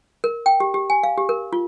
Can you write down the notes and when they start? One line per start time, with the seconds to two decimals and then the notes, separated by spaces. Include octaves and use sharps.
0.24 A#4
0.46 G5
0.60 G4
0.74 G4
0.90 G#5
1.03 F5
1.18 G4
1.29 A#4
1.53 F4